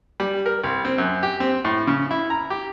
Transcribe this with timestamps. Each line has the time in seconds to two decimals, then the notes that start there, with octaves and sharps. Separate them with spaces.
0.20 G3
0.46 A#4
0.64 C2
0.85 C4
0.98 F#2
1.23 G4
1.40 C4
1.65 A2
1.87 C#3
2.11 E4
2.30 A#5
2.50 G4